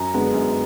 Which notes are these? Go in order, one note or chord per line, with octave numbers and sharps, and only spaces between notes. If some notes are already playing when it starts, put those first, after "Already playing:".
Already playing: F#2 A#5
D3 G#3 B3
F#2